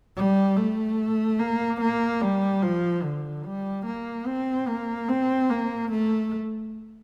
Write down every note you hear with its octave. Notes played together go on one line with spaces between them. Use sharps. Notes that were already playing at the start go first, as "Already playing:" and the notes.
G3
A3
A#3
A#3
G3
F3
D3
G3
A#3
C4
A#3
C4
A#3
A3